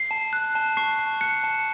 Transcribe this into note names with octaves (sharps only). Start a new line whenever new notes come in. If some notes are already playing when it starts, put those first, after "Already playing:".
Already playing: C7
A5
F#6
A5
C#6 C7
A5
F#6 C#7
A5